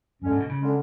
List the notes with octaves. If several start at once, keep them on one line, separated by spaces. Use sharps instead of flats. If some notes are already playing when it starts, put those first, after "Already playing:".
F#2 D3 G#3 C#4
G#2
B2
C#3
D3 G#3 C#4